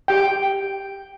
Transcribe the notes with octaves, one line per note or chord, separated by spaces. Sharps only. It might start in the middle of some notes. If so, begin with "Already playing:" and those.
G4 G5